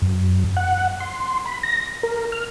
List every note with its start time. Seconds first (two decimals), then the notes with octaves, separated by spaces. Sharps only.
0.02 F#2
0.57 F#5
1.00 C6
1.46 B5
1.63 A#6
2.03 A#4
2.32 F6